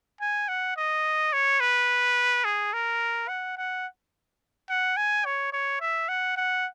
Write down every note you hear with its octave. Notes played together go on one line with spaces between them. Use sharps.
G#5
F#5
D#5
C#5
B4
G#4
A#4
F#5
F#5
F#5
G#5
C#5
C#5
E5
F#5
F#5